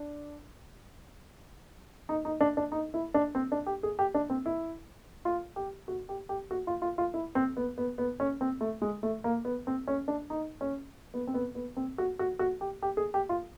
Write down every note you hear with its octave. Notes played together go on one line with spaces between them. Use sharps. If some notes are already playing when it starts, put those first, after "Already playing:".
Already playing: D4
D#4
D#4
D4
D4
D#4
E4
D4
C4
D4
G4
G#4
G4
D4
C4
E4
F4
G4
F#4
G4
G4
F#4
F4
F4
F4
E4
C4
B3
B3
B3
C#4
C4
A3
G#3
A3
A#3
B3
C4
C#4
D4
D#4
C#4
B3
C4
B3
B3
C4
F#4
F#4
F#4
G4
G4
G#4
G4
F4